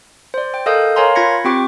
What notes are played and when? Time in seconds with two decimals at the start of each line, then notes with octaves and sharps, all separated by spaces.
0.34 C5 D5
0.54 G5
0.66 A4 A#4 D#5 F5 D#6 G6
0.96 A#4 C#5 F5 G#5 A#5 C6
1.15 F4 B5 G#6 A#6 C#7
1.45 C4 F4 G4 G5 C#6 D6